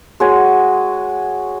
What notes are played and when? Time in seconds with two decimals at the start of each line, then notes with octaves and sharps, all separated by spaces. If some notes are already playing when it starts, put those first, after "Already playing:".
0.20 G#3 F#4 C#5 G#5